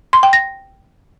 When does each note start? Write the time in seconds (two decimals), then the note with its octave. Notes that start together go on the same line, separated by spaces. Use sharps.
0.13 C6
0.23 G5
0.33 A#6